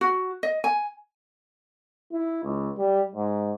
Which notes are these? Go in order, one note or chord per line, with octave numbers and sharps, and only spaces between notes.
F#4
D#5
G#5
E4
C#2
G3
G#2